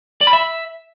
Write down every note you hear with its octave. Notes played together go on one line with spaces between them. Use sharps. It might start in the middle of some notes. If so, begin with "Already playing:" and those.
D5
B5
E5